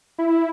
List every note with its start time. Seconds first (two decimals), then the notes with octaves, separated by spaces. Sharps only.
0.18 E4